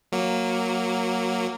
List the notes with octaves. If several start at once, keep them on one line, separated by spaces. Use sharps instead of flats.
F#3 A#3